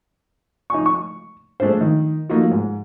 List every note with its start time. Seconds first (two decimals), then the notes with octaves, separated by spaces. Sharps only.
0.70 D#4 G#5 C#6
0.86 C#6
1.60 G#3 A3 D4 F4 C5
1.81 D#3
2.29 A3 A#3 D#4 F4 F#4
2.51 G#2